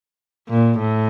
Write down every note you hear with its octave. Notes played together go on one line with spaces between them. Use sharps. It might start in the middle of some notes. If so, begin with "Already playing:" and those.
A#2
A2